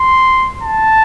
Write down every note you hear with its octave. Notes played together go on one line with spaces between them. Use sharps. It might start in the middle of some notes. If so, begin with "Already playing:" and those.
Already playing: C6
A5